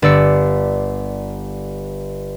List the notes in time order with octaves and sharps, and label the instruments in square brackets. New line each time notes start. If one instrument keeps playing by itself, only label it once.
[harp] G1 D5 E6 C#7